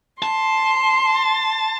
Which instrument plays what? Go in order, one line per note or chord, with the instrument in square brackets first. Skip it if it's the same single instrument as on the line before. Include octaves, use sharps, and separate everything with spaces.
[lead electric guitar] A5 [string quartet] C6